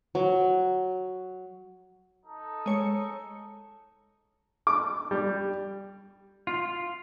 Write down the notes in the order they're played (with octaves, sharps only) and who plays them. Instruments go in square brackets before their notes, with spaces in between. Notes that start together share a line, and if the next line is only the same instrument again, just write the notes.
[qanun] F#3
[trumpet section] D#4 A4
[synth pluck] G#3 C#5 C#7
[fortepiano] D6
G3
[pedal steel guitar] F4